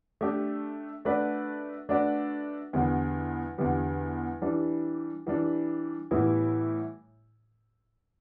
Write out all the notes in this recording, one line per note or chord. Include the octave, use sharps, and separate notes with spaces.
A3 D4 G4
A3 D4 F#4 B4 D5
A3 D4 F#4 B4 D5
E2 D3 G3 B3
E2 D3 G3 B3
E3 G3 D4
E3 G3 D4
A2 E3 G3 B3 E4